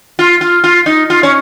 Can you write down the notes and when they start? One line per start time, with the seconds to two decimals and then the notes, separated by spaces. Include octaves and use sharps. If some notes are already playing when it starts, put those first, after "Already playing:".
0.19 F4
0.41 F4
0.64 F4
0.86 D#4
1.10 F4
1.23 C#4